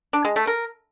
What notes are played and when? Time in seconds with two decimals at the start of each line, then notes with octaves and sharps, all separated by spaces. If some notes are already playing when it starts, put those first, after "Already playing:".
0.13 D4
0.25 G#3
0.36 A3
0.47 A#4